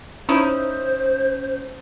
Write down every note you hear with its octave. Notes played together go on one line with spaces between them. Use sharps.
C#4 D#4 E4 C5